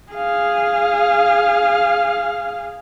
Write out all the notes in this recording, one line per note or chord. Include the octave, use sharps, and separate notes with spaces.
G#4 F5